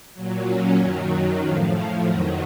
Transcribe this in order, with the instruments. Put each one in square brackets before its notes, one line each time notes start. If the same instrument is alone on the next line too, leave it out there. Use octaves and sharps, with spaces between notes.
[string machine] A#2 F#3
C#4
F#2 D#3 F#3
A2 F3 F4
F4
F2 D#3 F#3 F#4